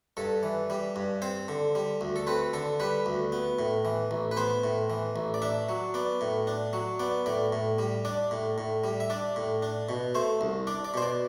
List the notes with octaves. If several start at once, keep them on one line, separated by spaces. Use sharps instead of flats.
G2 A4
E3
G3
G2
C4 C5
D3
G3
D2
A4
C4 B4
D3 A4
G3 B4
D2
B3
A2
E3
A1
B4
B3 C5
A2
E3
A1
D5
D4 E5
F#3
B3 D5
A2
D4
F#3
B3 D5
A2 D5
A2
G3
D4 D5
A2
A2
G3
E5
D4 D5
A2
D4
B2
A3 C5
C2
D4 D5
D5
B2 C5
D5